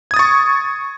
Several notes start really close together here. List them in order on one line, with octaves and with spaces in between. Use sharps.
G#6 D#6 A6 C#6